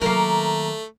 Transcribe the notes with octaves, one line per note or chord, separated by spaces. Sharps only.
D#3 F#3 A3 A#3 A#4 A#5